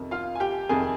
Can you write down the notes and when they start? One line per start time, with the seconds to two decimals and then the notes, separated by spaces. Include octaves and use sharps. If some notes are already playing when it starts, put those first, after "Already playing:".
Already playing: F2 C3 D#3
0.11 F4 F5
0.35 G#5
0.40 G4 G5
0.69 F2 C3 D#3 G#4 G#5